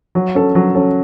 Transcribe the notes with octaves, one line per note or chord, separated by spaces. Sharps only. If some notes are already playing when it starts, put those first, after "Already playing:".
F#3
C#4 A4
F#3
C#4 A4